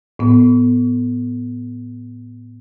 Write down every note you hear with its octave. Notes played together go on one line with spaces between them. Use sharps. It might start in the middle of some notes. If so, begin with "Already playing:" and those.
A2 B3